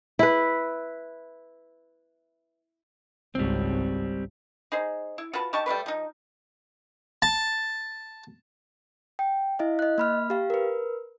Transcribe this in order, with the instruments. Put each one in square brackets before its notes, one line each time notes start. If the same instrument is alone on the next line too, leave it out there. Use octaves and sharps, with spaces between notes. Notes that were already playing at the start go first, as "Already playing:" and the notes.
[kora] E4 B4
[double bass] G#1 C#2 [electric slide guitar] G3 C4
[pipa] D#4 G#4 C5
E4
F4 F#4 B4 A5
D#4 G4 A5 C#6
G3 A3 D4 B4
F3 D#4
[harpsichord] A5
[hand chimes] G5
E4 D#5 F5
D#5 F#6
A#3 B5 F6
G4 F5
A#4 B4